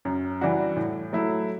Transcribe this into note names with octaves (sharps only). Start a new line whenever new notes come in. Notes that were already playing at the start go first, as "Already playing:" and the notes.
F#2
E3 G3 D4 F#4
A2
F#3 A3 E4